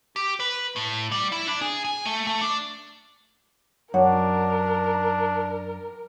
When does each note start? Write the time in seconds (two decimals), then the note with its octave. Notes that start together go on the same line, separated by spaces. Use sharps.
0.16 G4
0.40 B4
0.76 A2
1.12 G3
1.32 E4
1.47 D4
1.61 G#4
1.85 G#5
2.05 A3
2.27 A3
2.41 D4
3.94 F#2 D4 A#4 C#5 F#5